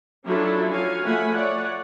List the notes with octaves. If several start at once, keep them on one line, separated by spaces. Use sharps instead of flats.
F#3 C#4 D4 E4 F4 A4
F3 F#4 C#5 F5 G#5
F3 A3 F#5 G#5 B5
C#5 D5 F#5